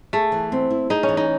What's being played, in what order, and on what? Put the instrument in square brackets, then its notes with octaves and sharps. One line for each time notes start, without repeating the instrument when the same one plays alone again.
[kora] A3 [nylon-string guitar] G#4
[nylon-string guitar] E3
C4
E4
[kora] D#4 [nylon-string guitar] G#4
[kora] C#4
[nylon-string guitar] E3
[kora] D#4